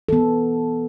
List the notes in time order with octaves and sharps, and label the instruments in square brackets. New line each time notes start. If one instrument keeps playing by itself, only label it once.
[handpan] E3 B3 A4